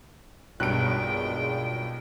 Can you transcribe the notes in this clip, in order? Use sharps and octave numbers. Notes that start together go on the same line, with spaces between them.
B1 G2 A#2 G#3 G5 F#6 D7